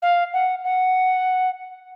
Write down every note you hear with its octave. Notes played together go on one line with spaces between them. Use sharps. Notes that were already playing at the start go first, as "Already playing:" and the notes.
F5
F#5
F#5